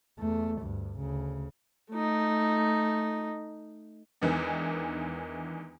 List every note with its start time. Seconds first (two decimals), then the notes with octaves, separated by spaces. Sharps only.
0.19 E2 A3
0.60 D2 G2
0.98 D2 C#3
1.92 A3 D#4
4.21 E2 D#3 E3 G#3 B3 D4